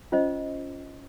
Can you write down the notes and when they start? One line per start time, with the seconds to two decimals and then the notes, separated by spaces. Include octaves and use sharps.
0.12 C#4 F4 C5 D#5